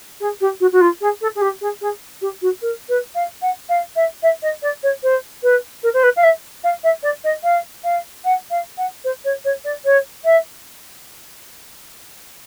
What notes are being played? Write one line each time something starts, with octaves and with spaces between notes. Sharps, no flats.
G#4
G4
F#4
F#4
F4
G#4
A4
G#4
G4
G#4
G#4
G4
F#4
A#4
B4
F5
F#5
F5
E5
E5
D#5
D5
C#5
C5
B4
A#4
C5
B4
F5
E5
F5
E5
D5
D#5
F5
F5
F#5
F5
F#5
C5
C#5
C#5
D5
C#5
E5